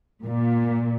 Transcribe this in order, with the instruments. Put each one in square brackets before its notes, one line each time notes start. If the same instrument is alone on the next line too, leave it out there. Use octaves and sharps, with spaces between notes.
[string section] A#2